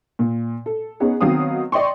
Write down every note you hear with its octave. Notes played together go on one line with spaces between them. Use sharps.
A#2
A4
B3 C#4 D#4 G#4
D#3 F#3 B3 C4 F5 D#6
D5 D#5 G5 C6 C#6